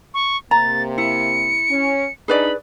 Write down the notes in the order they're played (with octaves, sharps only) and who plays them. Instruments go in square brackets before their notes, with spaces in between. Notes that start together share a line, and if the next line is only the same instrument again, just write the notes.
[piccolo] C#6
[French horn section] C3 A#3 [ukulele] A#5 [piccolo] A6
[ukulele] E4 [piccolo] C#7
[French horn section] C#4
[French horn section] D4 D#4 [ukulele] G#4 B4 D5 [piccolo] B5